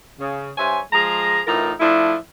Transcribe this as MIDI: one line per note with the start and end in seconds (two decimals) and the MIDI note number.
0.19 0.51 49
0.57 0.80 43
0.57 0.80 72
0.57 0.80 73
0.57 0.80 76
0.57 0.80 80
0.93 1.41 53
0.93 1.41 56
0.93 1.41 68
0.93 1.41 82
1.46 1.72 45
1.46 1.72 52
1.46 1.72 63
1.46 1.72 65
1.46 1.72 70
1.46 1.72 82
1.80 2.15 53
1.80 2.15 57
1.80 2.15 62
1.80 2.15 64